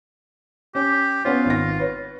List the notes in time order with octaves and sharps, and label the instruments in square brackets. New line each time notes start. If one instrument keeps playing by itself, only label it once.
[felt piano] C#4 [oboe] G4
[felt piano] B3 C#4 C#5 [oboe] F4
[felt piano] G#1 A#6
B4 C#5